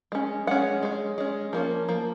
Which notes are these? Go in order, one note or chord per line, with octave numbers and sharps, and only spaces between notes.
G#3 C#4
G#3 C#4 F#5
G#3 C#4
G#3 C#4
F3 A#3 C#4
F3 A#3